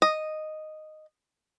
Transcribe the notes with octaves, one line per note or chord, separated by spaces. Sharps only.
D#5